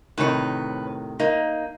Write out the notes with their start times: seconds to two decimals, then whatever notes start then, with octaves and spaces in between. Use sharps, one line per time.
0.18 A2 C3 D#3 B4 C#5
1.20 A#3 D#4